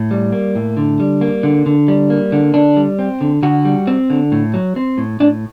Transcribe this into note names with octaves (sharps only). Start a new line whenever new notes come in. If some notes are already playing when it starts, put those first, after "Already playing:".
Already playing: A2
G3
A#3
A2
D3
G3
A#3
D3
D3
G3
A#3
D3
D3 D4
G3
C4
D3
D3 F#4
G3
C4
D3
A2
F#3
C4
A2
A2 D4